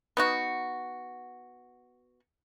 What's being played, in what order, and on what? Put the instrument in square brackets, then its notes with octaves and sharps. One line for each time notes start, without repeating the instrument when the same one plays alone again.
[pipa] B3 D#4 F#4